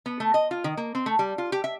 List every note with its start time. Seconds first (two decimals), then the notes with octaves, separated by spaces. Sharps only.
0.06 B3
0.20 A3
0.34 D#5
0.51 F4
0.64 D#3
0.77 A#3
0.95 C4
1.06 A3
1.19 G3
1.38 F4
1.52 G4
1.64 E5